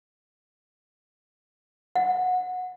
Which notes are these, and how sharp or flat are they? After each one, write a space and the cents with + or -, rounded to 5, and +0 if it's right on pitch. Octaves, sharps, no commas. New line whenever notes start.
F#5 -15